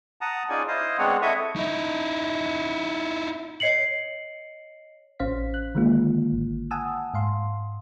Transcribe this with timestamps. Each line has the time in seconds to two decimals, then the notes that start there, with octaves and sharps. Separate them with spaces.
0.21 F#5 A5 A#5 D#6
0.49 C#4 D#4 F4 G#4 D5 G#5
0.68 E4 C5 D#5 F5 D#6
0.98 G#3 B3 C4 D4 C#5 F#5
1.22 E4 A4 D#5 E5 C#6 D#6
1.56 D#4 E4
3.60 C#5 D#5 C7 C#7 F#7
5.19 A1 C#4 C5 F5 B6
5.54 F#6
5.75 D3 D#3 G#3 A#3 F4
6.32 G#1
6.71 F#5 G#5 A5 D#6 E6
7.14 G#2 F5 C6